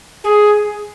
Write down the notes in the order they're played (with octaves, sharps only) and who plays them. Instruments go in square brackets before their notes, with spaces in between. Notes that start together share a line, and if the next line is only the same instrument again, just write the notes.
[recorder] G#4